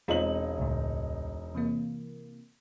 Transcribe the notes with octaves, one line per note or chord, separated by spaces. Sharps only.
E1 G#3 C4 D#4 F4 F#7
C#2 A2
C3 E3 A#3